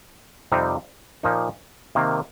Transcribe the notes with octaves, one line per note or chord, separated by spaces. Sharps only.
F2 C3 G3 C4 D#4
A#2 F3 A#3 D#4
C3 D#3 A#3